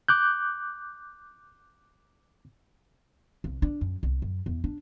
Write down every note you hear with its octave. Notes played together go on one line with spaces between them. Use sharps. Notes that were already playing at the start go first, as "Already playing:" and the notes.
D6 F#6 G6
C2
D4
F#2
C2
F#2
E2
D4